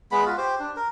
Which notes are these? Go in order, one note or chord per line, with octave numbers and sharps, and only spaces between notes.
G#3 B3 B5
F4 F#4
G4 C5
D4
A#4